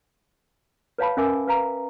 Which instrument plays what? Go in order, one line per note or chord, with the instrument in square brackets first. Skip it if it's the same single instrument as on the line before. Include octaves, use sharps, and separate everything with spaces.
[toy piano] B4 C#5 F5 A5 B5
C#4 A#4 E5 G#5 D6 E6
B4 F5 A#5